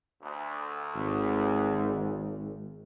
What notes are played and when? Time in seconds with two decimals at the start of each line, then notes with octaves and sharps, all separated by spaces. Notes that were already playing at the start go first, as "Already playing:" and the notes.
0.22 D2
0.95 G#1